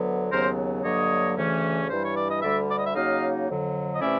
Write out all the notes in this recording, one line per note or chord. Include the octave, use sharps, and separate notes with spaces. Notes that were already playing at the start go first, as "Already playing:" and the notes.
Already playing: D2 D3 F#3 B3
D#2 C#3 F#3 B3 A#4 C5
G2 D3 F#3 A#3 C#5 D#5
D2 C#3 E3 A3 C#4
G2 E3 G3 C5
C#5
D5
D#5
D2 D3 G3 D5 E5
D5
D#5
E5
C#3 F#3 A#3 D#4 D#5 F5
F2 D3 F#3
D#5
C3 E3 A3 C#4 E4 D5 E5